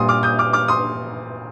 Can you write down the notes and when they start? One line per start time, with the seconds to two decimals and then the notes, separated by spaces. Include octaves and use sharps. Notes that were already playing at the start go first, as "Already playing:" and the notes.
Already playing: A#2 G3 C6 D#6
0.09 D6 F6
0.23 D#6 G6
0.39 D6 F6
0.53 D6 F6
0.68 C6 D#6